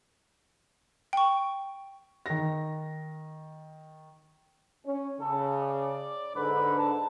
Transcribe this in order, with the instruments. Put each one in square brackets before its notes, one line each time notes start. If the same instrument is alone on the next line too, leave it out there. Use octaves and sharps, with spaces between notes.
[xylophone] G5 C#6
[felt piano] D#3 A#6
[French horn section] C#4
[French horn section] C#3 [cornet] A4
[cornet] D5
[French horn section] G#2 D3 [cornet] B4
[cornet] A5